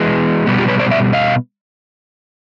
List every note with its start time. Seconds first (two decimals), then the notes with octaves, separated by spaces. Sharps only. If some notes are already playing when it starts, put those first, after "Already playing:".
Already playing: E3 G#3 B3
0.47 B2 G3 B3
0.58 F4 G4
0.68 B4 C#5
0.79 C5 D5
0.91 D5 E5
1.13 D#5 F5